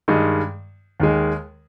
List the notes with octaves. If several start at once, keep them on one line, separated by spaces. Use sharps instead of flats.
G2 D#3 G#3
D#2 D#3 G#3